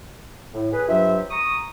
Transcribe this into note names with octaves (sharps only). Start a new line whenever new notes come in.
A2
G#4 B4
G2 F#3 F4 C5 E5
A#5 C#6 D#6